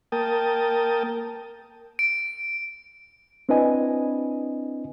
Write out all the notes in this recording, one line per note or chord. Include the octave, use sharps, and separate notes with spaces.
A#3 A#4 G5 A5 D#6
D7
C4 D4 E4 B4 D#5 G#5